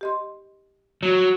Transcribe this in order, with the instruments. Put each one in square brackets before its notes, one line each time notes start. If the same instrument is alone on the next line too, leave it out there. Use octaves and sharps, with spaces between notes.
[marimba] G4 D#5 C6
[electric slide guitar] F#3